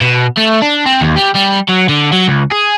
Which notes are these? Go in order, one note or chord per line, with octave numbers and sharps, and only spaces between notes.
B2
A3
D4
C4
D#2
G3
G3
F#3
D3
F#3
C#2
G#4